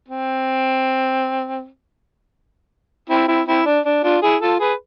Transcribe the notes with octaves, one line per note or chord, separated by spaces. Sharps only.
C4
C4 E4
C4 E4
C4 E4
D4
D4
D4 F4
E4 G#4
F4 A4
G#4 B4